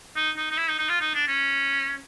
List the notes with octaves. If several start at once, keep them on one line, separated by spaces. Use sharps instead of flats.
D#4
D#4
D#4
E4
D#4
D#4
F4
D#4
D4
C#4